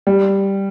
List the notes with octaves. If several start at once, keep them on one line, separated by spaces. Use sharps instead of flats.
G3